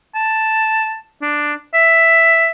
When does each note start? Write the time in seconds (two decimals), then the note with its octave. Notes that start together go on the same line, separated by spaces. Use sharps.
0.15 A5
1.22 D4
1.74 E5